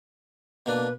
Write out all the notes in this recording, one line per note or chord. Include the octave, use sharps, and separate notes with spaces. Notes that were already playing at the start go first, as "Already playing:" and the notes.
B2 A#3 D4 B4